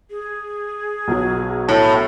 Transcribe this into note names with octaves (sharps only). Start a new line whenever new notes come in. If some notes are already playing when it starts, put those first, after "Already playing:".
G#4
B1 F#3
A2 A5